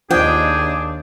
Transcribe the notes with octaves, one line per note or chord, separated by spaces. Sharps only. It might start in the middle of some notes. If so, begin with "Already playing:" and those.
D#2 F3 D4 G#4 D#5 G5